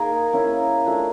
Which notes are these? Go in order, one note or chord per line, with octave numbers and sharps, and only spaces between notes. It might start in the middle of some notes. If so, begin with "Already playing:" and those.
Already playing: A#3 D#4 G#4 A#4
A#3 C#4 E4
A3 D4 F4